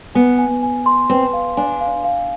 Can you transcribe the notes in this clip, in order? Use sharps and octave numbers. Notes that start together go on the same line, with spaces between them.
B3 G#5
G#5
G#5
C6
C4 B4
F5
D4 G#5
F5
F5